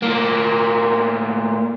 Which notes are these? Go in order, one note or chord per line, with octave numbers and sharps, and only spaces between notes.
A2 A#3